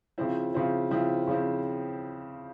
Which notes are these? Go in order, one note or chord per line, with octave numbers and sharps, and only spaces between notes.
C#3 F3 C4 E4
C#3 F3 C4 E4
C#3 F3 C4 E4
C#3 F3 C4 E4